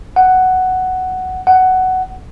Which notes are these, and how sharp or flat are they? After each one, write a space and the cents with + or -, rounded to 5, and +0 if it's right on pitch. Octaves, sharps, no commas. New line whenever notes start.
F#5 +5
F#5 +10